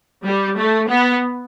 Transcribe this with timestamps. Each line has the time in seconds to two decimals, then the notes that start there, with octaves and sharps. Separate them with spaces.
0.25 G3
0.57 A3
0.90 B3